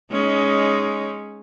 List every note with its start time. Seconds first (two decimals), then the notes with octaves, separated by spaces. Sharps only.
0.11 G#3 C#4 D#4